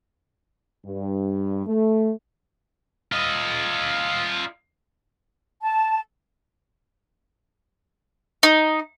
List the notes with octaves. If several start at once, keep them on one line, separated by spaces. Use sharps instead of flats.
G2
A3
F4 D#5
A5
D#4